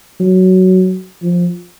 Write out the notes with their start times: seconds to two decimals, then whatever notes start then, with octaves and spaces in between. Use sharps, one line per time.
0.20 F#3
1.22 F3